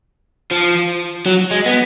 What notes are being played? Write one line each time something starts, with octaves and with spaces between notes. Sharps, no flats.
F3
F#3
G#3
B3